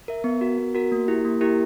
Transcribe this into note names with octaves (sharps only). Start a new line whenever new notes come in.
A#4 E5
B3
F#4 A#4
B3
F#4 A#4
A#3
E4 G4 A#4
A#3
E4 G4 A#4